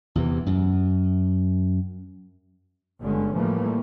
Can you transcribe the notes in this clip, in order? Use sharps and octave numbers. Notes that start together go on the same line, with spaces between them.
E2 C3 E3
F#2
G1 G2 D3 G#3 C#4
A2 E3 F3 G3 A3 A#3